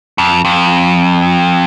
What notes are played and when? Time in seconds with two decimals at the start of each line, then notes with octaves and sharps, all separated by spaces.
0.18 F2
0.45 F2